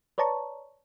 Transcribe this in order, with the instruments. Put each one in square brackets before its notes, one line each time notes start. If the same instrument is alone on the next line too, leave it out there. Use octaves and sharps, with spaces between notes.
[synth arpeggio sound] B4 C#5 D5 A5 A#5 C#6